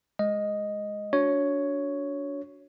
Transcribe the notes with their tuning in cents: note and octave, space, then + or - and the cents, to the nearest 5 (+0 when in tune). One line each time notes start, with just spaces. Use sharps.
G#3 +0 D#5 +0
D4 -30 F#4 -10 C#5 +5